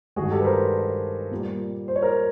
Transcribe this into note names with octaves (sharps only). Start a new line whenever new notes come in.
G2 D#3 G#3 F#4 G#4
G4 A4
B4
A#4 C5
A#2 G3 A#3
C5
C#5
A#4 C5